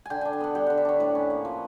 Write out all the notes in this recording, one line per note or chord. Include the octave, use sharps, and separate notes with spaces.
D3 G5 G#5
D4 G#5
G5
B3 F#5
G3 G5
D3 F#5
E5
D4 C#5
A2 B4
C#4
A#3
F3